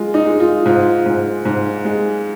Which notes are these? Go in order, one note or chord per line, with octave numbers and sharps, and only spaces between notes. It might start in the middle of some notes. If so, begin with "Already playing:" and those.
Already playing: G#3 F4
D#4
G#3
F4
G#2 F4
G#2
G#2
G#3